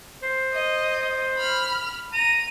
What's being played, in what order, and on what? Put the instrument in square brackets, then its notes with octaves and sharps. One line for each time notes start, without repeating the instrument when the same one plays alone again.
[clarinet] C5
[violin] D#5
B5 F6
[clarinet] A#5 [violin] D#7